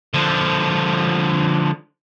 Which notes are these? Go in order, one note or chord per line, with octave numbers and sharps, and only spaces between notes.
D3 F3